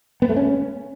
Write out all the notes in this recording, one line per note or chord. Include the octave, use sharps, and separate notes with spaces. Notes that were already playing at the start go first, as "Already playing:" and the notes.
B3
A3
C#4